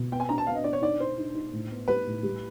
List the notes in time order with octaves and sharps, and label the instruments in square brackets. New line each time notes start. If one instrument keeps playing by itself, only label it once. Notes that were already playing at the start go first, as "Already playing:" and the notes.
Already playing: [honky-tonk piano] B2
[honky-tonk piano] B3 [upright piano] G5
[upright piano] G#5
[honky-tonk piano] D4 [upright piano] A#5
[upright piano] A5
[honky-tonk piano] B3 [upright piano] F5
[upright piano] D#5
[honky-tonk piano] D4 [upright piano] D5
[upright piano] C#5
[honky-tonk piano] D#4 [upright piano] D5
[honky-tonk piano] D#4 [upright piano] C5
[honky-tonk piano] D#4
D#4
A2
B3
[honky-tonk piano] G3 [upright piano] B4
[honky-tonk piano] A2
G3